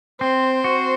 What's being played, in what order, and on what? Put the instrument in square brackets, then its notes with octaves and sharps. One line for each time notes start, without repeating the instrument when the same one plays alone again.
[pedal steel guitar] C4 [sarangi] C5
[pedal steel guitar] F#4